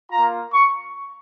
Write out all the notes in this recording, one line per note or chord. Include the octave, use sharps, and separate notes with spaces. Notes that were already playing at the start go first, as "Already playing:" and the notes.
A#3 F4 A#5
C#6